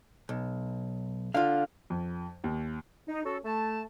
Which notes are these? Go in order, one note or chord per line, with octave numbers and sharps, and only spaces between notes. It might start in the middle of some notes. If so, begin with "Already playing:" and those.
B1
D3 F4 F5
F2
D#2
D#4
C#4 F#4 A4
A3 A5